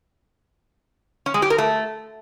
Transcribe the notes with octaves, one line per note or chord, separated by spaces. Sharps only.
C#4
G#3
G4
A#4
A3